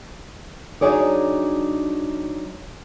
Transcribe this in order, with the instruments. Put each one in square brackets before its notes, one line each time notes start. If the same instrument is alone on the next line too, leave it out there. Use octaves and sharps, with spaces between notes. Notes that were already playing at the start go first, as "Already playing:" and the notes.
[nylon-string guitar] F#3 D4 D#4 G#4 C#5 D5